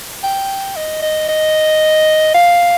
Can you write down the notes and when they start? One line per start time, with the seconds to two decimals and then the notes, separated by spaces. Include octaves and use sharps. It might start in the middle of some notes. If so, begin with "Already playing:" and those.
0.24 G5
0.76 D#5
1.02 D#5
1.29 D#5
2.34 F5